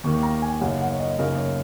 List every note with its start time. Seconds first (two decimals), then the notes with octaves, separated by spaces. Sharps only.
0.04 D#2 D#3 A#3 C#6
0.23 A#5
0.42 G#5
0.61 F#2 C#3 A#3 D#4 F#5
0.81 F#5
0.93 C#5
1.00 D#5
1.19 F#2 C#3 A#3 D#4 A#4
1.38 C#5